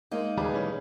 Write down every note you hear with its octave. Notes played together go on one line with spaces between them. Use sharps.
G#3 A#3 D#4
D#2 G3 D4 G#4 B4 B5
B1 E3 C#4